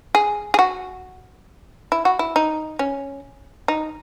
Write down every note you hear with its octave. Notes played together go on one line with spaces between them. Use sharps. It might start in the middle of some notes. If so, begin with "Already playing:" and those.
G#4
G#4
F#4
E4
F#4
E4
D#4
C#4
D#4